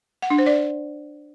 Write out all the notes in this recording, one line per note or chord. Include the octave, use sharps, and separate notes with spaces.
F#5
D4
C5
D5